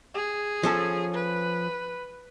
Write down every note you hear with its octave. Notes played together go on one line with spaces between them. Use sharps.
G#4
F3 C#4 A4
B4